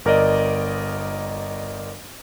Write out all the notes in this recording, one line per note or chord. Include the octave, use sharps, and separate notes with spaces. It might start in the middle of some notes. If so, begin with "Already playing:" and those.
G1 A#4 D5 D#5